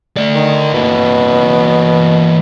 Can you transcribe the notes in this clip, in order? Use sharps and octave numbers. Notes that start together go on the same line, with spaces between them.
A3 D5
D#3
B2 E3 A#3